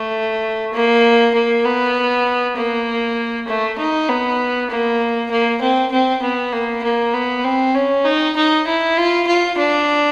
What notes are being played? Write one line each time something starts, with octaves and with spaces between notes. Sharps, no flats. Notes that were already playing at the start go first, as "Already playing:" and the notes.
Already playing: A3
A#3
A#3
B3
A#3
A3
D#4
B3
A#3
A#3
C4
C4
B3
A#3
A#3
B3
C4
C#4
D#4
D#4
E4
F4
F4
D4